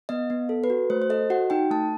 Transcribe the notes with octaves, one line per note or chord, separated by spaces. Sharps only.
B3 D#5
B3
A4
B4
F#4
A3 C5
C5
A4 D#5
F#4 F#5
D#4 G5
A3 A5